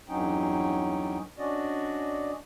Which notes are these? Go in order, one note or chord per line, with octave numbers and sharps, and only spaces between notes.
E2 G2 F#3 C#4 D#4 G5
C#4 D4 F#4 D5 D#5